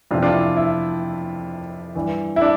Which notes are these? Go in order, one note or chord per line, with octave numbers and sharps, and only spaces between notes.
F2 C3 E3 D4 F4
D4 F4
E4
E4
G2 E3
E4
D4